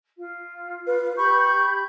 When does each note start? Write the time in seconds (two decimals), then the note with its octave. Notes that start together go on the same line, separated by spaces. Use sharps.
0.17 F4
0.87 B4
1.17 G4 B5 C#6 G6